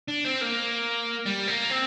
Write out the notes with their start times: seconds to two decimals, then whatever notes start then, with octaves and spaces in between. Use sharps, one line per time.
0.08 D4
0.25 C4
0.41 A#3
1.26 G3
1.48 A#3
1.70 C4